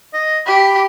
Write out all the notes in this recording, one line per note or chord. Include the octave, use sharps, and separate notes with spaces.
D#5
G4 B5